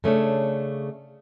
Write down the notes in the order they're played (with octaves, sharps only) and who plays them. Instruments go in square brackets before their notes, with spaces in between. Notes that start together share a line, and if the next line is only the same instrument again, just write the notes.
[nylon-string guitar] C#3 A3 C#4 D4